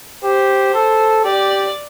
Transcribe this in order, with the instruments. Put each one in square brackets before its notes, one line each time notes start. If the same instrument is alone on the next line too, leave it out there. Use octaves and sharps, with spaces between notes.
[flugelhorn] G4 [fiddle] C5
[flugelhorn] A4
[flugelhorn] G4 [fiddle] D5